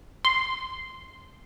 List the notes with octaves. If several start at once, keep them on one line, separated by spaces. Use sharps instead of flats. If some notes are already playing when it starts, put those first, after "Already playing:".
C6